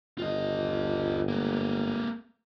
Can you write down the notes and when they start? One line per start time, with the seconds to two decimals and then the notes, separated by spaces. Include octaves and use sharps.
0.19 G1 F4 D#5
1.29 G#3 A#3